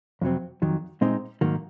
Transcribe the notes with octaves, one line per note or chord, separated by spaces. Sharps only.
F2 C3 F#3 C4
F2 D#3 F#3
A#2 G#3 C4 D#4
G#2 D#3 F#3 A#3